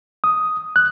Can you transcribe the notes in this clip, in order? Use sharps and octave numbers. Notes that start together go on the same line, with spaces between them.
D#6
F#6